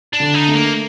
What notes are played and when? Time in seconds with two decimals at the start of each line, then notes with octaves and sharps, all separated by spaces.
0.13 D4
0.20 D3
0.34 D#4
0.48 A3
0.55 A#3